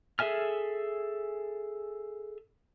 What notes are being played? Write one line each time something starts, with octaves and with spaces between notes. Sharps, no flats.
G#4 A4 E5 G#5 F6